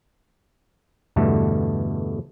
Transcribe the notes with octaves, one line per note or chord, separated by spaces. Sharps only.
E2 G2 B2 D3 A3